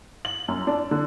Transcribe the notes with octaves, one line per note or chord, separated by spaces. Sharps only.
F#7
F#2
D4
D3